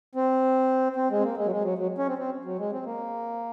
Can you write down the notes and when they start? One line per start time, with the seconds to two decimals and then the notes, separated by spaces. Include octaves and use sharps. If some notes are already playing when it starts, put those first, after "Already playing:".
0.15 C4
0.96 C4
1.11 G#3
1.19 C4
1.24 A#3
1.37 G#3
1.46 F#3
1.51 G#3
1.64 F#3
1.78 F#3
1.98 C#4
2.08 C4
2.18 C4
2.45 F#3
2.59 G#3
2.72 C4
2.85 A#3